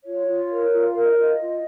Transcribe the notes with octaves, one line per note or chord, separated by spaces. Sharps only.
F4 C#5
F4
A#4
F4
A#4 F5
D#5
C#5
F4 D#5
F4